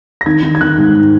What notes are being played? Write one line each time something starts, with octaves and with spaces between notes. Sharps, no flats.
A#6
D#3 G#6
D#3
G#6
D#3 F#6
G#2